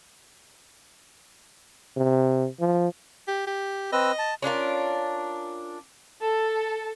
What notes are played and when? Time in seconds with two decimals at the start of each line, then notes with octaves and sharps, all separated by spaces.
1.97 C3
2.60 F3
3.28 G4
3.47 G4
3.93 C4 B4 D#5 E6
4.19 A5
4.42 C#4 D4 F4 A#4
6.22 A4